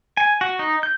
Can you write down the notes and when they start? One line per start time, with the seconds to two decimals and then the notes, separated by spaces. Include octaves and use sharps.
0.17 G#5
0.41 F#4
0.59 D#4
0.83 G6